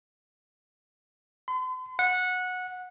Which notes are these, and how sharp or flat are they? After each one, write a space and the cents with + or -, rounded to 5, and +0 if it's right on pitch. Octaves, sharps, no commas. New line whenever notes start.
C6 -45
F#5 -15